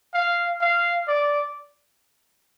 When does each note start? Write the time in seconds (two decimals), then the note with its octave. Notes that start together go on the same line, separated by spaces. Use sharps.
0.13 F5
0.61 F5
1.08 D5